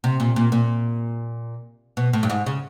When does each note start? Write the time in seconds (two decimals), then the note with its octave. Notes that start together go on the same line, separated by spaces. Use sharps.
0.04 C3
0.20 A#2
0.36 A#2
0.52 A#2
1.97 B2
2.13 A2
2.23 G2
2.30 G#2
2.46 C#3